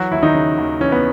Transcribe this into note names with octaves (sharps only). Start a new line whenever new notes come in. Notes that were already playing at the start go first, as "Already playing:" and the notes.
Already playing: E3 F#3 F#4
D#2 E4
D#3 D#4
C#3
D#2
E3 C#4
B3